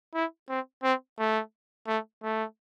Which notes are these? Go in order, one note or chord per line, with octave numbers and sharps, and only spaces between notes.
E4
C4
C4
A3
A3
A3